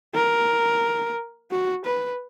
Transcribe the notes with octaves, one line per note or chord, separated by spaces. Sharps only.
A#4
F#4
B4